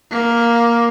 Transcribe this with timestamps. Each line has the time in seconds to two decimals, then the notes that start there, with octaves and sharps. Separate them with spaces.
0.11 A#3